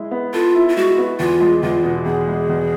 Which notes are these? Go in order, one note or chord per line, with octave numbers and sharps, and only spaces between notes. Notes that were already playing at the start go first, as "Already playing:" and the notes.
Already playing: G#3 E4
B3
F4 A4
E4
F4
G#3 F#4
B3
E2 F4
G#3
E2 F4
B2
E2 G#4
G#3
E2